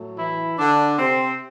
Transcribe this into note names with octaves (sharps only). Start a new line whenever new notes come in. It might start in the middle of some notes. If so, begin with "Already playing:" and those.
Already playing: A2 F#3 A3
E3 E4
D3 D4
C3 C4